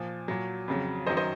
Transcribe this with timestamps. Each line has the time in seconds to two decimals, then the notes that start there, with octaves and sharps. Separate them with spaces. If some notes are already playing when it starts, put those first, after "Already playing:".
Already playing: A#2 F3
0.28 A#2 F#3
0.68 F2 C#3 F#3
1.07 F#2 D#3 F#3 C5 D#5
1.17 C5 D#5